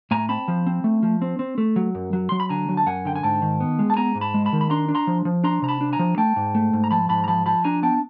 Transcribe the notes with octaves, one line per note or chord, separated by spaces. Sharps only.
A2 G#5 A#5
C4 A5 B5
F3
C4
A3
F3
C4
C4
A3
F#3
F#2
F#3
F#3 C6
B5
D3 G#5 A#5
F#3
A5
F#2 F#5 G#5
D3 G5
G#5
G#2 G5 A5
D#3
B3
G#3
A5
B3 G#5 A#5
G#2
A5 B5
G#3
A5 B5
D#3
B5
D4 A#5 C6
D4
A#5 C6
F3
F3
D4 A#5 C6
C3 A#5
A5 B5
D4
G#5 A#5
F3
A3 G5 A5
G#2
A3
G#2
A#5
F3 A5 B5
G#2 A5 B5
A#5
F3 A5 B5
F3 A5 B5
D4 G#5 A#5
B3 G5 A5